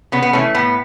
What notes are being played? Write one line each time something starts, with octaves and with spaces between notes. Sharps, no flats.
C#3 B3
B3
E3 A3 C#4
A2 B3